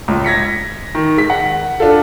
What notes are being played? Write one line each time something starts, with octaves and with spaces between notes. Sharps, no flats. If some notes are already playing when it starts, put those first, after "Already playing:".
C#2
G#6 A#6 B6 C#7
D#3
G#3 B6
F#5
D4 F4 A4